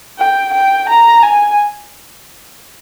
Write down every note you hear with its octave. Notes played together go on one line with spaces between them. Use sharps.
G5
G5
A#5
G#5